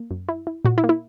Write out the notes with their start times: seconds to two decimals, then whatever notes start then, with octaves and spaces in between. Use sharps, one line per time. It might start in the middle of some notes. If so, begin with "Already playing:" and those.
Already playing: A#3
0.11 F#2
0.29 E4
0.47 E4
0.65 A#2 F#4
0.78 E4
0.84 A#3
0.89 E4